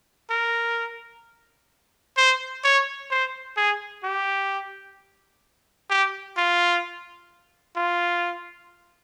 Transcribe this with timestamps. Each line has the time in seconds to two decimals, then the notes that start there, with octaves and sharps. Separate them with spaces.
0.30 A#4
2.17 C5
2.64 C#5
3.11 C5
3.57 G#4
4.04 G4
5.90 G4
6.37 F4
7.76 F4